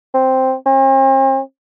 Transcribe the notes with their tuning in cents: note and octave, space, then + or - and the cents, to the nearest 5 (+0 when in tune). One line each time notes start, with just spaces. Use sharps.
C4 +0
C4 +45